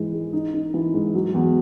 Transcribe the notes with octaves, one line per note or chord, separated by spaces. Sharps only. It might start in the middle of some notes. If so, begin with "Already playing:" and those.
Already playing: G#2 E3 G#3
G#3
D#4
D#4
E3
G#2
F#3
E2